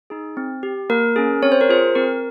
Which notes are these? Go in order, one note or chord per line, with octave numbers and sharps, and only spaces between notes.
D#4 G#4
C4
G4
A#3 A#4
C#4 G#4
C4 C#5
C5
A#4
F4 G#4 C5
C4 A#4